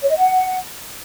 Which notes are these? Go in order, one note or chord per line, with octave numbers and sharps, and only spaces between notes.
C#5
D#5
F#5